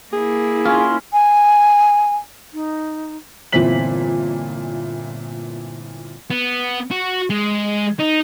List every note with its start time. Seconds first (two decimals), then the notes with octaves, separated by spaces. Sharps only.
0.13 A#3 E4 G#4
0.65 C#4 F4
1.13 G#5
2.53 D#4
3.52 G1 A#2 E3 C4 B6 F#7
6.30 B3
6.91 F#4
7.30 G#3
7.99 D#4